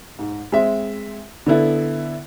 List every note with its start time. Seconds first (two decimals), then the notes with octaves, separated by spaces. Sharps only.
0.19 G#2
0.52 G#3 C4 E5
1.46 D3 B3 E4 A4